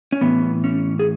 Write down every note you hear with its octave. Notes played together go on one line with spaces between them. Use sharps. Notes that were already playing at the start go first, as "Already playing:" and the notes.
C#4
A2 E3 B3
C#4
G#4